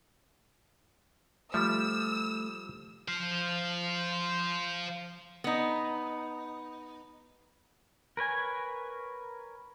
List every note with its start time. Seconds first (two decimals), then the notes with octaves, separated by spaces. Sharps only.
1.54 F3 G3 A3 E6
3.08 F3 C5 F5
5.44 B3 D#4
8.17 A#4 B4 C#5 G#5